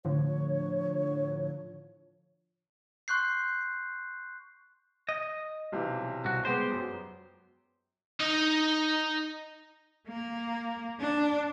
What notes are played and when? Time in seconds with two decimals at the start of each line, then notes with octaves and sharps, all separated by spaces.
0.05 A2 D3 F3 C#5
3.08 C6 C#6 F#6 G6 C7
5.09 D#5
5.72 B1 C3 E3
6.25 C2 F#4
6.45 G#3 B3 G4 C5
6.72 F#2
8.20 D#4 D#5
10.08 A#3
11.00 D4